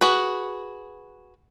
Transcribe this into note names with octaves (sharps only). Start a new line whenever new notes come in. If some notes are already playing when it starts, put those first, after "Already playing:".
F#4 G#4 B4